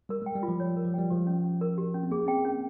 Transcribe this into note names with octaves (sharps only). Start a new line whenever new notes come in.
G3 A#4
G#3
G5
G3
F4
F3
C#5
A#4
F3
G3 G5
F3 G4
C#4
C#4
A#4
G4
C#4
C4
A#3 G#4
C4 G5
A#3
C#4